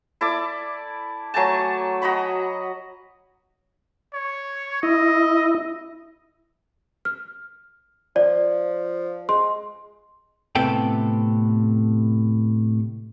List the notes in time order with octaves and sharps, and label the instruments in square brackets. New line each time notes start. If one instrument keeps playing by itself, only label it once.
[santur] E4 A4 D5 D6
F#3 A3 G#5 A5
F#4 D#5 A#5 B5
[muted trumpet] C#5
[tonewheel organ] E4 [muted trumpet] D#5
[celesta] F6
[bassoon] F3 [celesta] D5
[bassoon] G#3 [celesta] C6
[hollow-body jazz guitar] A2 C3 B3 A4 G5